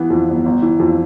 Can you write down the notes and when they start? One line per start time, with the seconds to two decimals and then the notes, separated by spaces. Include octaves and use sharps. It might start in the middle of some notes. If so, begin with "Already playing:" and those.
Already playing: E3 B3
0.10 F2
0.29 G1
0.46 G1
0.62 E3
0.80 F2